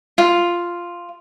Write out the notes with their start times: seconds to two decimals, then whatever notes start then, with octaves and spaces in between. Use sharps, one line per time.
0.18 F4